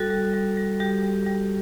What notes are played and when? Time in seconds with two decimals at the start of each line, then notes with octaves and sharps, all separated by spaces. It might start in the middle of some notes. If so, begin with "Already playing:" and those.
Already playing: G3 F#4 A4
0.10 G3
0.34 G3
0.57 G3
0.80 G3 G4
1.03 G3
1.26 G3